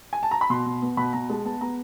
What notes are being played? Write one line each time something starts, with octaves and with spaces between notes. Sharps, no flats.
G#5
A5
A#5
B5
B2 C6
B2
B3
B2 B5
B2 A#5
G#3 A5
B3 A5
B3 A#5